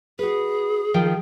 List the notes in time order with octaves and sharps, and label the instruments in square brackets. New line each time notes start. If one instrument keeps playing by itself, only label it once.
[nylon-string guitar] F#4 B4 [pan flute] G#4
[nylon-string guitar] D#3 F3 G5